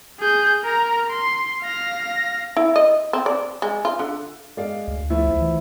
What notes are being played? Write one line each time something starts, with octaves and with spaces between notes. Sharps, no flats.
G#4 G6
A#4 A#5
C6
F5 A#6
E4
D#5
C4
D5
G#3
F4
D3
G#3 D5 F5
D2
F3 A3 E4
C#2
E3